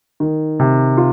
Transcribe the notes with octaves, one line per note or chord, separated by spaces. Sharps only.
D#3
C3
F4